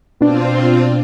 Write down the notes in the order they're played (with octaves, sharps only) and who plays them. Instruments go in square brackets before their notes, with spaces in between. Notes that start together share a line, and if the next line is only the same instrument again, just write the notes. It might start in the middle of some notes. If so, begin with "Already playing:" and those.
[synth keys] B2 D4 [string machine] C4 F4